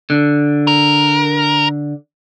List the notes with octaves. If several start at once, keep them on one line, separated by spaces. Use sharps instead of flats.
D3
A#4